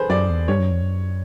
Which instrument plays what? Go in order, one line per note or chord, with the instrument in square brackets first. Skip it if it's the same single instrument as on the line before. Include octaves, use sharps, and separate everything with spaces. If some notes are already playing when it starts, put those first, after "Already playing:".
Already playing: [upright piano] G#4 A4 B4 C5
[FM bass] F#2 [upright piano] D5
[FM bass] E2
[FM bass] G2 [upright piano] C#5
[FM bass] F#2
F2
F#2